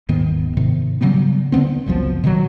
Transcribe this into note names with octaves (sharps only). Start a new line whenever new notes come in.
D#1 G#2 D#3 B3
G#2 C3 D#3
C#3 F#3 G3 B3
D3 D#3 B3 C4
G1 C#2 F#2 F3
B2 D#3 E3 F#3